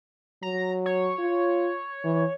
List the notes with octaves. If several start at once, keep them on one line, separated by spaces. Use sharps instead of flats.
F#3 A#5
C#5
F4
E3